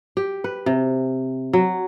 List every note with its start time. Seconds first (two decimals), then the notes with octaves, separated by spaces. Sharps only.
0.17 G4
0.44 B4
0.66 C3
1.53 F#3